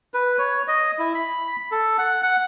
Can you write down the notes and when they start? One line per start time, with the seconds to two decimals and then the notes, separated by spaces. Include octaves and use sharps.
0.14 B4
0.38 C#5
0.68 D#5
0.99 E4
1.14 B5
1.72 A4
1.98 F#5
2.23 F#5